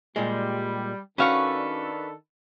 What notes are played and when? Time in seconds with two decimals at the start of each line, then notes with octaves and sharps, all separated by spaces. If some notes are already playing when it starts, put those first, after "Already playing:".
0.16 A#2 G3 G#3
1.18 D#3 C#4 D4 F#4 A4 B4 F5 C#6